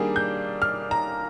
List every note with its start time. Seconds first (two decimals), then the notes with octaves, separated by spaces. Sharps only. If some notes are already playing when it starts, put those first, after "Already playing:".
Already playing: D#3 G3 A#3 D4 G#4
0.16 G6
0.62 F6
0.91 A#5